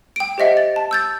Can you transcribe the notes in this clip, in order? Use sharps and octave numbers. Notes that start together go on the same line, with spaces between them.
G5 D7
G4 C5 D#5 E5 F#5
A6
A5
E6 G6 A6